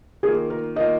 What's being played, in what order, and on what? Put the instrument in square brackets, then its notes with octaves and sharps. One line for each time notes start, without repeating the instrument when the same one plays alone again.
[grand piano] D#3 A#3 F4 [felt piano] G#4
[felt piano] A#4
[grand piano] D#3 A#3 F4 [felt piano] D#5